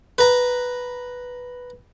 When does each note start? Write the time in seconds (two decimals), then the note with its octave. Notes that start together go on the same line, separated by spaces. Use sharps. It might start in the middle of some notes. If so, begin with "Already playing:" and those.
0.18 B4 A#5